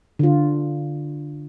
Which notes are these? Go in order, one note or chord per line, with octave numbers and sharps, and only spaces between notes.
D3 F4